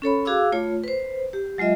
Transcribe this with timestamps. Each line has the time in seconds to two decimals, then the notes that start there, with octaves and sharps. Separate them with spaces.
0.02 C#4 A4 C#5 B5
0.25 F#4 G#4 F5 D6 E6
0.52 A3 F4 C#5
0.84 B4 C5
1.33 G4
1.58 F#3 G#3 F4 D#5 E5